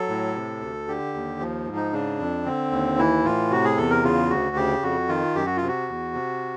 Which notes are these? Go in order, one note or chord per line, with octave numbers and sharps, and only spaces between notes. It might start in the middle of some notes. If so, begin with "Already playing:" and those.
Already playing: F#3 A4
A2
C3
D2
D3 G4
D#2
F3
G#2
D#4
C#3 D4
F2
D3 C4
D#2
E3 E4
A2 F4
C3 F#4
G#4
E2 A4
A#4
C#3 F4
D2 F#4
C#3 G4
F2 F#4
D#3 F4
F#2 G4
F#4
F4
C3
F#4
E2
C3